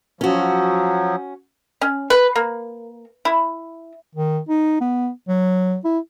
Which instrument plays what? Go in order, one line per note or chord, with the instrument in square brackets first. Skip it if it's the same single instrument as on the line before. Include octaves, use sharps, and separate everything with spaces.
[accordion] F3 F#3 [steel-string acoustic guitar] C#4 F#4
[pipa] C#4
B4
A#3
E4
[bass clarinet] D#3
D#4
B3
F#3
E4